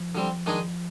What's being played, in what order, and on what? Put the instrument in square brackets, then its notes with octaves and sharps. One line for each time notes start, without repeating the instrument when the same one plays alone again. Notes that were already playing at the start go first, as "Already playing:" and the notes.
Already playing: [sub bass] F3
[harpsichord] D3 G3 C4
D#3 G#3 D4 G#4 D#5